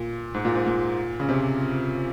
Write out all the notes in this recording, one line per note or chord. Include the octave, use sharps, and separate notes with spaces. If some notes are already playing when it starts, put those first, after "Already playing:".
Already playing: A#2
G#2
A#2
G#2
A#2
C#3
C3